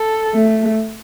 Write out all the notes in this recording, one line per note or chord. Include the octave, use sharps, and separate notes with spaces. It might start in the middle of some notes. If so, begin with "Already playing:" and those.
Already playing: A4
A3